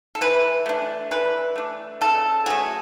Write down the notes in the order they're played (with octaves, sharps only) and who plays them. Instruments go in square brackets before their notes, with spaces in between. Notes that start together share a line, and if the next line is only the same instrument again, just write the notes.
[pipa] A4
E3 B4
A3 D4
E3 B4
A3 D4
C#3 A4
F#3 A3 G#4